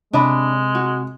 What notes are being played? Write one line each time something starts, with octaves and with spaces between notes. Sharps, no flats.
C3 G#3 D4 D#5 B5
F#4